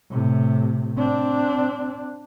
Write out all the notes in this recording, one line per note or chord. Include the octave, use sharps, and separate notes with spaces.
A2 C3
C4 D4